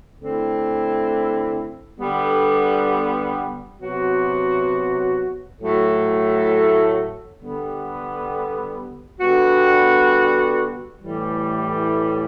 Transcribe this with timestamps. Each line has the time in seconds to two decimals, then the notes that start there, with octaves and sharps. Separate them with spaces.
0.19 D3 A3 C4 E4
1.99 D3 G3 B3
3.80 C3 F#3 B3 F#4
5.59 A2 F#3 A3
7.40 D3 G3 B3
9.20 D3 G3 B3 F#4
11.01 A2 E3 G3